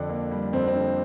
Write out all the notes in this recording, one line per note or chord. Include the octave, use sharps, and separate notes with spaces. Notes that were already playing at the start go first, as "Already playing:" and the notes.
Already playing: F2 D3 D4
A#3
G3
F2 C4
C4
D3